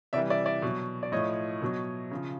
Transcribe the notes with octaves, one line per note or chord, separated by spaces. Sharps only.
C3 E3 G3 D5 E5
D5 E5
D5 E5
B2 F#3
D5
A2 F3 C#5 D#5
B2 F#3
C#3 F3